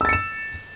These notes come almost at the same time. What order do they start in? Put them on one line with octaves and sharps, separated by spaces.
E6 A6 C#7 E7